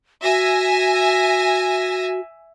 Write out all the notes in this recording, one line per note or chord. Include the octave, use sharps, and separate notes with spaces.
F#4 E5 G#5 A#6